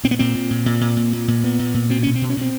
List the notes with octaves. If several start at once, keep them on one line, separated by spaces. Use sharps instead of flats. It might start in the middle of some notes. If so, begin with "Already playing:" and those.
A#2 C4
B3
A#2 C4
A#2
A#2
A#2
A#2
A#2
A#2
A#2
A#2 B3
A#2
A#2
B2 C4
B2 C#4
C4
B2
C#4
B2 C4